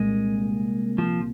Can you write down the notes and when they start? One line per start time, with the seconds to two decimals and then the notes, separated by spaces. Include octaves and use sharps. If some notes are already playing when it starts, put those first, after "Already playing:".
Already playing: C2 A#2 G3 G#3
0.98 F3